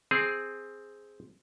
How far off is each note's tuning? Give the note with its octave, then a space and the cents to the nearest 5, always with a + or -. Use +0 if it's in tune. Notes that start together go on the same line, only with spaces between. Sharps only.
C4 +0 G#4 +0